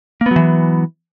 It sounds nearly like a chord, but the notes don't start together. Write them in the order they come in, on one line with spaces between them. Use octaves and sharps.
A#3 B3 F#3 E3